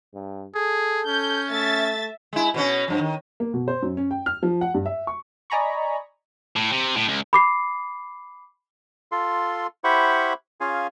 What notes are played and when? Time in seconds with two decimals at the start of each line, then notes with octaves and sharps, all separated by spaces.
0.14 G2
0.55 G#4 A4
1.07 C#4 G6
1.51 A3 E5 A6
2.33 G#3 E4
2.54 B2 B3 C#4
2.88 G2 F3
2.99 D#3
3.40 A#3
3.54 B2
3.68 C5
3.82 F#2
3.97 C#4
4.11 G5
4.26 F6
4.43 F3
4.61 F#5
4.74 G2
4.86 E5
5.07 C#6
5.50 D5 D#5 G#5 A#5 B5 C#6
6.56 A2
6.72 C3
6.96 A2
7.08 C#2
7.33 B5 D6 C7
9.12 F4 A4 C6
9.84 E4 G4 C5 F#5 B5 C#6
10.61 C#4 F4 G#4 F5 G#5